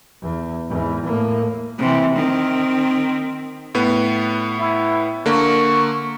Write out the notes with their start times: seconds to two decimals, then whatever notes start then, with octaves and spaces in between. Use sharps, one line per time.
0.22 E2
0.69 E2 G#2
1.06 A2 A#3
1.78 C3 E3
2.15 D#3 C4
3.75 A2 B3
4.60 E4
5.26 D3 A#3 C#6